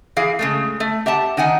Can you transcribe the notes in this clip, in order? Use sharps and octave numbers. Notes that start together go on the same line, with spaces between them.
E3 G#4 F5
C#3 G#3 A3
A3
G4 E5 F#5 A5
D#3 D#4 F#5 G#5